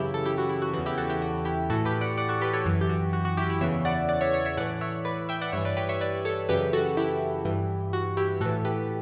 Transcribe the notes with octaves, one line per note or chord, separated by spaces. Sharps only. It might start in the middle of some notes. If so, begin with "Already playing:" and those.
Already playing: F#2 C#3 E3 E4 G4
A4
E4 G4
F#4
E4
F#4
E2 C#3 E3 F#4
E4 G4
F#4 A4
E4 G4
F#4
E4 G4
A2 E3 F#4 A4
G4 B4
D5 F#5
D5 F#5
F#4 A4
G4 B4
A4 C#5
F#2 E3
G4
F#4
F#4
F#4
E4 G4
E4 G4
E2 C#3 E3 C#5 E5
D5 F#5
D5 F#5
C#5 E5
C#5 E5
C#5 E5
A2 E3 D5 F#5
C#5 E5
B4 D5
E5 G5
D5 F#5
G2 E3 C#5 E5
B4 D5
G4 B4
C#5 E5
B4 D5
A4 C#5
F#2 C#3 E3 G4 B4
F#4 A4
E4 G4
G2 E3
F#4
E4 G4
A2 E3 F#4 A4
G4 B4